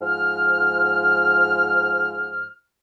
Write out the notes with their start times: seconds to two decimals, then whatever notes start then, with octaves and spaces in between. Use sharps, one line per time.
0.01 G#2 F3 F6